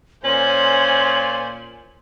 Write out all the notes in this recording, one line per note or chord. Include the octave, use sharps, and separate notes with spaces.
A#2 C#4 C5 G#5 F#7